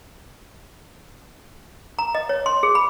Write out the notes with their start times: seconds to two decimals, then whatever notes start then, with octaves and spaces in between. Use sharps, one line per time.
1.99 A#5
2.15 D#5
2.29 C#5
2.46 C6
2.63 G#4
2.75 B5